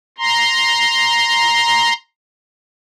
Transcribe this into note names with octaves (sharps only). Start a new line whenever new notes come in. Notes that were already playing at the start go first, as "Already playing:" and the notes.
A#5 C6